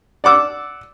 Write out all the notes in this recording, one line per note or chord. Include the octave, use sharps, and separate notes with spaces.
D5 F#5 D6 E6